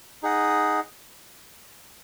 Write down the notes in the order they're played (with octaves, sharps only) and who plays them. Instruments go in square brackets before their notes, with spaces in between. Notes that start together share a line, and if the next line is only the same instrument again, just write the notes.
[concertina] D#4 G#4 D#5 F#5